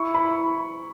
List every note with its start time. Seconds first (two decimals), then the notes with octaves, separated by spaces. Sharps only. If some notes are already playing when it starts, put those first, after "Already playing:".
Already playing: E4 C#6
0.14 B5